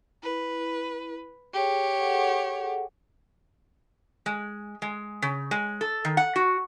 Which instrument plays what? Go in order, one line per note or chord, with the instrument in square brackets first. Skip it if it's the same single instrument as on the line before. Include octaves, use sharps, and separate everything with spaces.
[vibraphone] E4 [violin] B4
[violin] G4 C#5 [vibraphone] G#4 G5
[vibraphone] G#4 A4 F#5
[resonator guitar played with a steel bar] G#3
G#3
C#3
G#3
A4
D#3
F#5
F#4